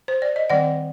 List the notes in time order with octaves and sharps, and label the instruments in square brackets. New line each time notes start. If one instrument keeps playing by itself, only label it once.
[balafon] C5
D5
D#5
D#3 G3 C4 D5 F#5